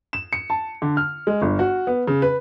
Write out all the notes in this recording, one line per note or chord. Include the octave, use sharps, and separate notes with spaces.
E7
C#7
A5
D3
F6
G#3
G1
F#4
B3
C#3
B4